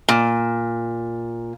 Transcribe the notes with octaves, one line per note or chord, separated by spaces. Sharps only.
A#2